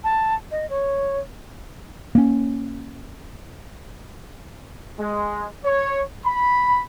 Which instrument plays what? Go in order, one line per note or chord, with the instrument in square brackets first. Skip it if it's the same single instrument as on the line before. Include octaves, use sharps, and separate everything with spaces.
[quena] A5
D#5
C#5
[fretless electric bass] A#3 C#4
[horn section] G#3
C#5
B5